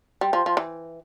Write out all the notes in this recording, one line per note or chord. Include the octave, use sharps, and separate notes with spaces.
G3
F3
F3
E3